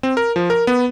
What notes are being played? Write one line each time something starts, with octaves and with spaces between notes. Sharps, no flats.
C4
A#4
F3
A#4
B3